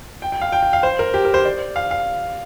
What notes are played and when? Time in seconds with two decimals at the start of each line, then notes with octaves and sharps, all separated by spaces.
0.22 G5
0.32 G5
0.41 F5
0.52 G5
0.63 G5
0.73 F5
0.83 C5
0.99 A#4
1.14 G4
1.25 A#4
1.34 C5
1.45 D5
1.76 F5
1.91 F5